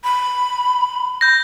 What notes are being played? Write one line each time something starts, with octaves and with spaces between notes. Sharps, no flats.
B5
G6 A#6